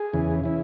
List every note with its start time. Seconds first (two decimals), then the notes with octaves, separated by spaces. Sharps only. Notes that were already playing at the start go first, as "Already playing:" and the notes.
Already playing: G#4
0.13 E2 C#3 E3
0.44 C#3 E3 E4